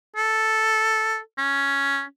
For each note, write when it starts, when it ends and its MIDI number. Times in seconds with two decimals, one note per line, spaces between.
0.16 1.19 69
1.38 2.04 61